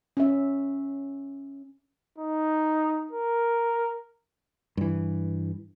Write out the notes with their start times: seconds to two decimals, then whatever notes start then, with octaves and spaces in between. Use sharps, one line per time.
0.17 C#4 E5
2.18 D#4
3.11 A#4
4.77 G2 E3